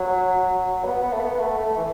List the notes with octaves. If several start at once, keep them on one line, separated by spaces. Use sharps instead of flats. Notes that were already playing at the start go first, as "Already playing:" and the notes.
Already playing: F#3
B3
B3
A3
B3
B3
A3
A3
E3